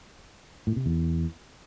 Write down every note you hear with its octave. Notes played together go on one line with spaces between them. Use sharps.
A2
C3
E2